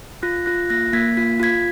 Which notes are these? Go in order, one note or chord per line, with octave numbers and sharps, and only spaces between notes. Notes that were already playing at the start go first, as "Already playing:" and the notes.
F4 F#6 A#6
F4 F#6 A#6
A#3 F#6 A#6
A#3 G#6 B6
F4 B6
F4 G#6 B6